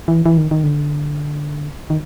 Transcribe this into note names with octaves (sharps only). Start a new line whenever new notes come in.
E3
E3
D#3
D#3
D3
D#3